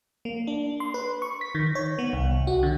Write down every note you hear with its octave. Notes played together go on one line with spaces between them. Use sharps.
A#3
D4
C6
B4
C#6
B6
D#3
C#5
B3
C2
F#4
D3